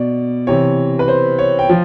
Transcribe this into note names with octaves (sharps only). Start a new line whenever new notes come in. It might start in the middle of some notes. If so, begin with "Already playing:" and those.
Already playing: B2 D5
C3 E3 C#5
B4
C5
C#5
G5
F3